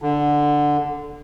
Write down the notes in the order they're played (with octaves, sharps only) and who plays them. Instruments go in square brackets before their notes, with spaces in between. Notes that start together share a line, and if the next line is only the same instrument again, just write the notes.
[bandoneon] D3